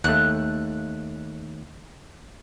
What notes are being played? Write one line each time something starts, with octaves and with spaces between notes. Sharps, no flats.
D#2 A3 F#6